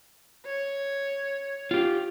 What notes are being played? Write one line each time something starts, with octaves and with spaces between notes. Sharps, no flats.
C#5
F4 G4